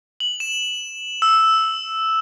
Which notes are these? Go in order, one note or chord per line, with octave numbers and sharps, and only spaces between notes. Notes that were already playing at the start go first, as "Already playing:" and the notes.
F#7
E7
E6